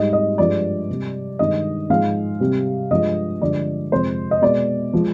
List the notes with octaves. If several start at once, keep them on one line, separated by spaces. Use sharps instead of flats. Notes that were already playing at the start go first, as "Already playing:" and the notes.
Already playing: G#2 G3 D#5
D#5
G2 F3 G#3 D5
C3 G3
G2 D#3 G#3 D#5
G#2 F3 G#3 F5
C3 G3
G2 F3 G#3 D#5
G2 D3 F3 G#3 D5
F2 C3 F3 G#3 C5
D#5
B2 G#3 D5
F3 G#3